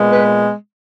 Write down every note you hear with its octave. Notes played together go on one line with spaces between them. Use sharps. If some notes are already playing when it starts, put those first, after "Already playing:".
Already playing: A#2 G#3 B3
B4